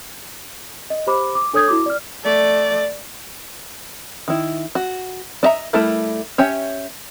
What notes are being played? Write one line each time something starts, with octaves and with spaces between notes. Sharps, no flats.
D#5
G4 C5 B5 D6
D6
D4 A4 C#5 D#6 G6 G#6
E4 F#4 D6
D5 F6
A3 D5
D#3 E4
F#4
D4 D#5 E5 A#5
G3 A3 E4 A4 A#4
C#4 G4 C#5 E5